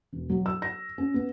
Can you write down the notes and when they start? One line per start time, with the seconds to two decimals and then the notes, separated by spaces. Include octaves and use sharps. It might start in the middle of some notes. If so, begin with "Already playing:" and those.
0.13 E1
0.30 F#3
0.46 E6
0.62 A#6
0.98 C#4
1.14 B3